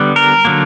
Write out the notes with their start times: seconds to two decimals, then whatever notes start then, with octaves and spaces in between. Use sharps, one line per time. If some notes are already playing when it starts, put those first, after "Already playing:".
Already playing: D3 G3 B3
0.16 A#4
0.45 D3 F#3 A#3